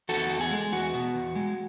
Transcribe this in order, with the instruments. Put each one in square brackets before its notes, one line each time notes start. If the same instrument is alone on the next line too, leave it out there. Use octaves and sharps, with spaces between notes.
[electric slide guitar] E2 F#4 A4
E2
G#4
G#3
E2 F#4
B2
E2
G#3